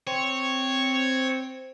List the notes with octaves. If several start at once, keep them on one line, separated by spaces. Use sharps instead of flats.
C4 C#5